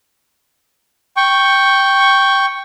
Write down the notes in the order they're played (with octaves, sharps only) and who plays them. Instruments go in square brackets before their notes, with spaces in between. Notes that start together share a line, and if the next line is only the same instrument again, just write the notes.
[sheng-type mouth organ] G5 C#6